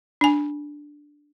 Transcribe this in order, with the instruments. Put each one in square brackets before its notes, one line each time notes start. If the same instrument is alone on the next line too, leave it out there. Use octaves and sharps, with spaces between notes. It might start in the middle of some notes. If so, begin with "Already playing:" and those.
[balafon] D4 G#5